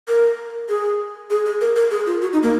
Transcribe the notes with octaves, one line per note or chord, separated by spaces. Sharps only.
A#4
G#4
G#4
G#4
A#4
A#4
G#4
F4
F#4
D#4
A#3